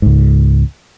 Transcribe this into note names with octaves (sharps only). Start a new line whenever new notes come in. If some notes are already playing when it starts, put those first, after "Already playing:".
C#2 G#2